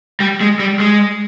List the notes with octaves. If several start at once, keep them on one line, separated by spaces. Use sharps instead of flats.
G3
G#3
G3
G#3